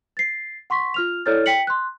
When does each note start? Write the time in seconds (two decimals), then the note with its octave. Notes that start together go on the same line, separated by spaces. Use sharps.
0.17 A6 C7
0.70 F#5 C6 C#6 B6
0.94 F4 F6 F7
1.26 E4 A4 C#5 D5 F6 A6
1.46 G5 B6 C#7 F#7
1.67 C6 F#6